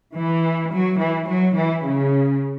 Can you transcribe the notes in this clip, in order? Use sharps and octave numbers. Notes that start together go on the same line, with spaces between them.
E3
F#3
E3
F#3
E3
C#3